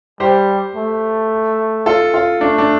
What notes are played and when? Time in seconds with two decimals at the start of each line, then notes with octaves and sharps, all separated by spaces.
0.20 G3 G4 C5
0.75 A3
1.86 F4 A4
2.14 F4
2.41 A3 D4
2.58 D4